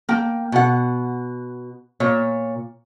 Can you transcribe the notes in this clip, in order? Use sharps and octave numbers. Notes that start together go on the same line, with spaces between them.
A#3 G5
B2 F#5
A#2 C#5